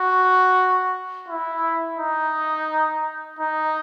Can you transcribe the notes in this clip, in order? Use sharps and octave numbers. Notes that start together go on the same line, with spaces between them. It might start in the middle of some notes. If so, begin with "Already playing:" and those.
Already playing: F#4
E4
D#4
D#4